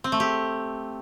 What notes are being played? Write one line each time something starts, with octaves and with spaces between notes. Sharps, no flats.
C4
A3
G4